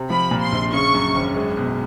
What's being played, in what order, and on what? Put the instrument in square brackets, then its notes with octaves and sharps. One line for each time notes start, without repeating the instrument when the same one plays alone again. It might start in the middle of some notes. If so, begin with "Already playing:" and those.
Already playing: [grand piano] C3
[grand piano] F3 [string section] B5
[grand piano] A#2
[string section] C6
[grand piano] A#1
[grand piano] C#3 [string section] C#6
[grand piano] F#2
G#1
G#3
B2